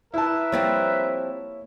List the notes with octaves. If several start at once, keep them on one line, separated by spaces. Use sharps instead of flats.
E4 A#4 B4 E5 A5
F3 G3 A#3 C4 C#5